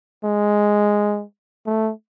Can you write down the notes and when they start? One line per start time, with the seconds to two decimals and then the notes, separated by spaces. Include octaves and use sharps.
0.24 G#3
1.66 A3